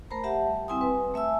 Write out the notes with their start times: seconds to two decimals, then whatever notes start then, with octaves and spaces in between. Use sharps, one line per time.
0.10 A3 A#4 C5 A#5 B5
0.24 G4 E5 F#5 A5
0.46 G3
0.68 G3 C4 E4 G#5 C6 D#6
0.81 B4
1.14 A3 E5 G#5 E6